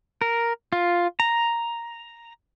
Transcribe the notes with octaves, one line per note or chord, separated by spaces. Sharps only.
A#4
F4
A#5